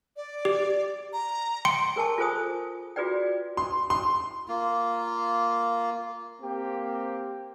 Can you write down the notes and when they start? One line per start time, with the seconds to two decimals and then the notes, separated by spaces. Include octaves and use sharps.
0.16 D5
0.45 G4
1.13 A#5
1.65 G5 C6 C#7
1.96 G#4 A#4 G#5 A5 C#6
2.18 F4 G#4 A4 C5 G#5 D#6
2.96 F4 F#4 G#4 B4 D5 G5
3.57 C6
3.90 C6
4.48 A#3 F4
6.41 A#3 C4 G4